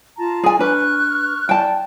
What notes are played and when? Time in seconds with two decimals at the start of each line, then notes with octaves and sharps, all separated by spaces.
0.18 F4 A5 A#5
0.44 G#4 G#5
0.59 D4 B4 C#6 F6 F#6
1.49 E4 D5 G5 A5